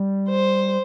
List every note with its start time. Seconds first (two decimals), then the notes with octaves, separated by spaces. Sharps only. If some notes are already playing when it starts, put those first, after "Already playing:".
Already playing: G3
0.29 C5